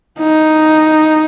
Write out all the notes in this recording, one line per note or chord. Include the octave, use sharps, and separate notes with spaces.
D#4